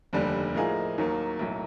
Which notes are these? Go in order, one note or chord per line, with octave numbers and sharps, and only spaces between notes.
F1 D#2 D3 G3
A2 F3 A#3 D#4 G#4
D#2 D#3 F#3 A#3
B1 A2 F#3